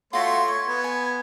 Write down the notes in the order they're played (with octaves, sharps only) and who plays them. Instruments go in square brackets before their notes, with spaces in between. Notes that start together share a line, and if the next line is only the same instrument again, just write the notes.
[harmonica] A3 C#5 C6 [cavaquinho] F4 F#4 E5
[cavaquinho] C#6 [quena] G#6
[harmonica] B3 [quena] G#6
[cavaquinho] G#5